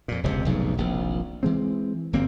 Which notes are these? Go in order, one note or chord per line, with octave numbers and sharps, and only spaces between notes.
F2 A#2
E1 C#2 G#2 C3
F1 B1 G#2 C#3
D#1 A#1 D#2 C3
E3 G#3 C4
G1 F#2 A#3 C4